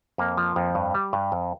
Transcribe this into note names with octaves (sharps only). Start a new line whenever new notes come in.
F2 A#3
F3
F2
G2
G3
G2
F2